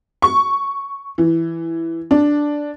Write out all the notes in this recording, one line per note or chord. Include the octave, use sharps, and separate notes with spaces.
C#6
E3
D4